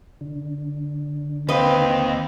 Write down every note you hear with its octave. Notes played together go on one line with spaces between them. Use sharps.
D3
D#2 C4 B4 D#5 F5